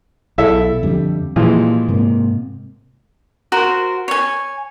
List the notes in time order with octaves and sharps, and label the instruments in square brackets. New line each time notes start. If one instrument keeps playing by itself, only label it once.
[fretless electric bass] B1 [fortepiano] E4 A4 E5
[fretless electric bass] F2 D3 G3
[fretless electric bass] A#2 G3 [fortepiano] E3 F3 G#3
[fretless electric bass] G#2 C3 A#3
[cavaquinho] F#4 A#4 C5
C#5 G#5